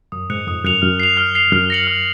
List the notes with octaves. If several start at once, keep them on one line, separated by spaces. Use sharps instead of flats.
F#2 D#6
G#2 F#6 C#7 F7
F2 D#6
F#2 F#6 C#7 F7
F#2 F6
C7 F7
F6
C7 F7
F#2 F6
A#6 C#7 F#7
F6